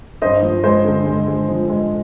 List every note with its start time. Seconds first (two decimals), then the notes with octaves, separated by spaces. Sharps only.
0.21 G2 C5 D#5
0.42 F3
0.64 G#3 C5
0.85 D3
1.06 G#3
1.28 G#3
1.48 F3
1.70 G#3